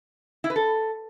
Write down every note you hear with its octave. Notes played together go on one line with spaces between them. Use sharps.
E4
B4
A4